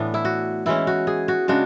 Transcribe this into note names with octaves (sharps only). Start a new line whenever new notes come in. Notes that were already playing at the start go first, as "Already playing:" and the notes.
Already playing: A2 E3 B3 D4
E4
F#4
E3 G#3 C#4 E4
F#4
G#4
F#4
C#3 G#3 D4 F#4